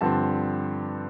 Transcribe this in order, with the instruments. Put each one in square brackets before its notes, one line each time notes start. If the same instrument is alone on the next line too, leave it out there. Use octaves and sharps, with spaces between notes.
[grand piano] G2 D3 F3 C4 A5